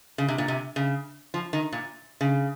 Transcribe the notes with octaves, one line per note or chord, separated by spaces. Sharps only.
C#3
C3
A#2
C3
C#3
F3
D#3
A#2
C#3